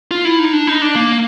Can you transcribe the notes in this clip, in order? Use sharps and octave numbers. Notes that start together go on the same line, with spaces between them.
F4
E4
D#4
D4
D#4
D4
A#3